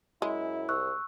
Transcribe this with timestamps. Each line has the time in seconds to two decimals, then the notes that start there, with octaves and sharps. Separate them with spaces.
0.22 F#2 G#3 E4
0.69 C2 C#6 E6 F#6